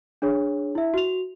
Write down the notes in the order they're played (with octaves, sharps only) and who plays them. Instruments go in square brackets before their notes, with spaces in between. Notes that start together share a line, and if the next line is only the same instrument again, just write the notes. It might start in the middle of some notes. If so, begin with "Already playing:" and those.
[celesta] D4 G#4 C#5
E4 E5
F#4 F7